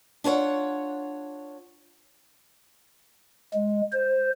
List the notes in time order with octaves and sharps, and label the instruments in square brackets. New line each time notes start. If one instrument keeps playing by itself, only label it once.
[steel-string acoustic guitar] D4 F4 C#5 F#5
[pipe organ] G#3
C5